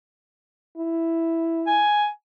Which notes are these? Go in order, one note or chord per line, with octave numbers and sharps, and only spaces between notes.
E4
G#5